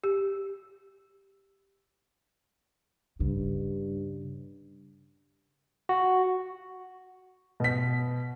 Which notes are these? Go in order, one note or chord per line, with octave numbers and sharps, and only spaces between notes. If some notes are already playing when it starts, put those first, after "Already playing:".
G4
G2 C#3
F#4
B2 B6